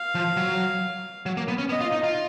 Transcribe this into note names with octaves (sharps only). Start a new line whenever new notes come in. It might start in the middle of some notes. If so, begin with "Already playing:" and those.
Already playing: F5
F3
F#3
F#3
A#3
B3
C#4
B3 D#5
F4
D#4
F4